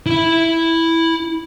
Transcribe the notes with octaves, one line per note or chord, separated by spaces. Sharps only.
E4 B5